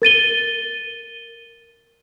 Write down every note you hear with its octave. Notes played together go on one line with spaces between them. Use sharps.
A#4 A6 D#7 G7